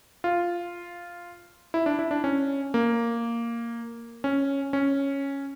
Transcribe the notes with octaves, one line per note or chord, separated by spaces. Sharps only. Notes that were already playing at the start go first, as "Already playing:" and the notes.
F4
E4
D4
E4
D4
C#4
A#3
C#4
C#4